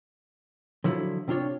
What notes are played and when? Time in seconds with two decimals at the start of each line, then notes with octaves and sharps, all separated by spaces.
0.84 D3 F3 F#3 E4
1.28 C3 D4 F4 C#5